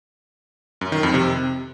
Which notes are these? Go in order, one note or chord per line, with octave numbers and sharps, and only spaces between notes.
F#2
D#3
F2
C3